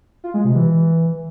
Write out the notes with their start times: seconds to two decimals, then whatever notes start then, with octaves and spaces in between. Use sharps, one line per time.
0.24 F4
0.34 G#3
0.44 C3
0.55 E3